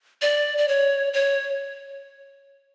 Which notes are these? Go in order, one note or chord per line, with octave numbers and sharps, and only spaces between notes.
D5
D5
C#5
C#5